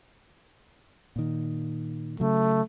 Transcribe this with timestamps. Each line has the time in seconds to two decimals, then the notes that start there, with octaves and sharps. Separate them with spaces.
1.16 A#2 D#3
2.20 C#3 F#3 A3